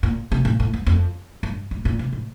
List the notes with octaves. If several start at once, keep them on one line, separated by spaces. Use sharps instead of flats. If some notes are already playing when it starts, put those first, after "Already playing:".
A#2
C3
A#2
A2
G2
F2
G2
A2
A#2
C3
A2